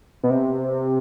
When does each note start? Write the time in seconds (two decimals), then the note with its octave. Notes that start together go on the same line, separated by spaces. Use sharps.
0.23 B2
0.30 C3